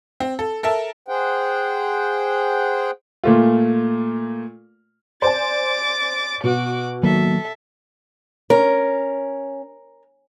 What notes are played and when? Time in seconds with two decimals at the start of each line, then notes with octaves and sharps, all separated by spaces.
0.20 C4
0.39 A4
0.63 A4 A#4 E5 A5
1.08 G#4 C5 F#5 G5
3.24 A#2 A3 F4
5.22 C5 D5 G#5 D6 A6
6.44 B2 F#4 D6
7.03 D#3 F#3 A#3 A4 E5
8.50 C#4 A#4